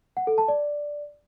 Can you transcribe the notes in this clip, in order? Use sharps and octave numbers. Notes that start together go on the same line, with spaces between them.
F#5
A4
A5
D5